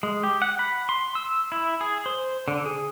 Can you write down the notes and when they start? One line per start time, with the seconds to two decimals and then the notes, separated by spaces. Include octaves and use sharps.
0.03 G#3
0.23 G4
0.42 F#5
0.59 B5
0.89 C6
1.15 E6
1.52 E4
1.81 G#4
2.06 C5
2.48 D3
2.66 G#4